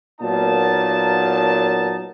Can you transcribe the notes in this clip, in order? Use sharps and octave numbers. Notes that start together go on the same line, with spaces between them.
A#2 F#3 A#3 B3 D#4 A5